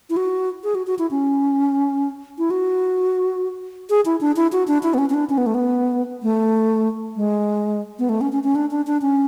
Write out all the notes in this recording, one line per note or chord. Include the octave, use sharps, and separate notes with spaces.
E4
F#4
G#4
F#4
F#4
E4
C#4
E4
F#4
G#4
E4
D4
E4
F#4
D4
E4
B3
C#4
C#4
D4
C#4
B3
A3
B3
A3
G#3
B3
A3
C#4
C#4
C#4
D4
D4
D4
C#4